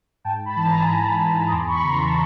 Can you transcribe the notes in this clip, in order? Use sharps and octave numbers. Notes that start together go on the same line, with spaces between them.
G#2 G5 A5
A5 B5
E3
A5
G#5 A#5
G#2
E3
D#6
E2 C6 D6
B5 C#6
C#3 E3 A#5 C6
A5 B5